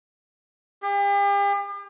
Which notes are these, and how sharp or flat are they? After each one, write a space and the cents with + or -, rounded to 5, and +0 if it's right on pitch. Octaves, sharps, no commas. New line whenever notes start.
G4 +40